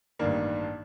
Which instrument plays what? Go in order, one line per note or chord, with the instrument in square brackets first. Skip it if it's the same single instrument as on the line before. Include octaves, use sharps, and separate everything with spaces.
[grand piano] A1 G2 D#3 A#3 D4